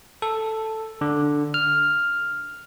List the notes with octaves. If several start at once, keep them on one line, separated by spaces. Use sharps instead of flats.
A4
D3
F6